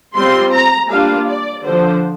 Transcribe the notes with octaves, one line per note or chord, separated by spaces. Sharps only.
G3 C4 F4 C6
A#5
G3 A#3 D4 F4 F5
D5
D3 F3 D4 C5